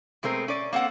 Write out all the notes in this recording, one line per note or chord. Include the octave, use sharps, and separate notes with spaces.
B2 G#3 A3 C4 A#4
C#4 D5
A#3 C4 A4 F#5